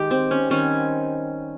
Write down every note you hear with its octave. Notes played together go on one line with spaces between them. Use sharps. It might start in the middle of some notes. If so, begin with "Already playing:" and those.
Already playing: D#3 G#3 G4
C4
C#4
D#3 G3 C4 C#4